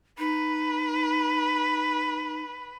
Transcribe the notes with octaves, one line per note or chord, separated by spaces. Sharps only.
D#4 B4